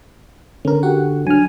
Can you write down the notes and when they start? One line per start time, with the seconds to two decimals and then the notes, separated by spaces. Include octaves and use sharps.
0.65 D3 C#4 A#4
0.83 F#4 G4 F#5
1.27 F#3 D4 G#5 F6